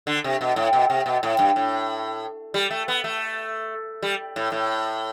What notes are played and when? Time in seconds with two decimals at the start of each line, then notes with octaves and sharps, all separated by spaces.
0.07 D3
0.24 C3
0.41 B2
0.56 A2
0.73 B2
0.90 C3
1.06 B2
1.23 A2
1.39 G2
1.56 A2
2.54 G3
2.71 A3
2.88 B3
3.04 A3
4.02 G3
4.36 A2
4.52 A2